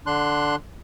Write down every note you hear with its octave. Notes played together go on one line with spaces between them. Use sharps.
D3 D4 C6 F#6